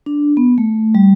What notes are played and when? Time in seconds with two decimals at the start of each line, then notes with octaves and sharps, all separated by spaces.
0.06 D4
0.37 B3
0.58 A3
0.95 G3